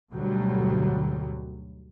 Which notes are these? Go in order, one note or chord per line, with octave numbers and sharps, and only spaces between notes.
D2 G#2 B2 D3 F#3 G3